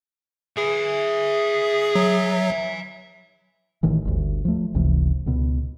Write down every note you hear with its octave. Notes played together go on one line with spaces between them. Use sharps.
G#4 E5 G#5
F#3
A1 A2 D#3 E3
G1 D2
F3 A3
F#1 C#2 C3 E3
C#2 B2